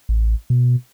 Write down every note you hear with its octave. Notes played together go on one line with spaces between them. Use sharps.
A1
B2